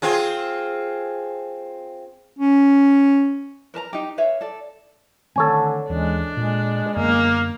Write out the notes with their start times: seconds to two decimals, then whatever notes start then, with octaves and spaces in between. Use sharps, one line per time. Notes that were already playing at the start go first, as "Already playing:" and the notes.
0.02 C4 F4 G#4
2.39 C#4
3.74 A#4 B4 A5 A#5
3.93 D#4 G4
4.18 B4 C#5 E5 F5
4.41 A4 D5
5.36 D3 D#3 A3 C4 A4 C#5 G#5
5.90 D#2 E3 G#3 C#4 D4
6.37 A#2 G#3
6.96 F#2 D3 A#3 B3